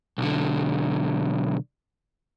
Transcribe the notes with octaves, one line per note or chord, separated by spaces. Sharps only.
B1 D3